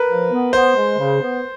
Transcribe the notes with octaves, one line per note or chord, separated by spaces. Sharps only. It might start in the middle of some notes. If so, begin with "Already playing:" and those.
Already playing: A#4 B4
F3
B3
B3 C5
G#3
C#3
B3